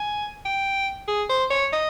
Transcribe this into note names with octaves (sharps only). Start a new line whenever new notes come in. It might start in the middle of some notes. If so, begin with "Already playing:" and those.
Already playing: G#5
G5
G#4
C5
C#5
D#5